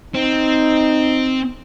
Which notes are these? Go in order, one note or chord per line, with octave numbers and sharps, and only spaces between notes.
C4 D#4